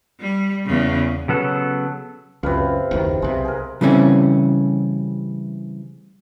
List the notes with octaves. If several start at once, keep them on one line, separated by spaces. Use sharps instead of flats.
G3
E2 C#3
C#3 F#3 B3 A4
C#2 F#2 C3 B4 F5
F#1 D#2 D#3
B1 C3 G#3
G#4 A#4
C#3 E3 G3 A3 C4 C#4